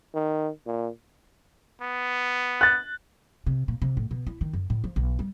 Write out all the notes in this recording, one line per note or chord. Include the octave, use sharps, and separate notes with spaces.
D#3
A#2
B3
F#6 A6
C3
A#2
C3
A2
B2
E4
D#3
F#2
A2
F3
B1
G3